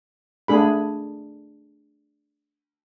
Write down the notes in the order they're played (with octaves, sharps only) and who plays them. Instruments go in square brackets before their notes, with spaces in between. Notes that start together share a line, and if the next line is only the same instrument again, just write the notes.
[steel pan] A3 D4 G#4 B5